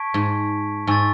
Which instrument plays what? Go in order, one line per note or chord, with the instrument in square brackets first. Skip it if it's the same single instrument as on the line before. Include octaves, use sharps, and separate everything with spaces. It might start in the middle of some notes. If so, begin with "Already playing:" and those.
Already playing: [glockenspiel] A5 C#6 G#6 B6 D7
[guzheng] G#2
[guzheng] G#2 [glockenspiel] G#5 C#6 E6 A6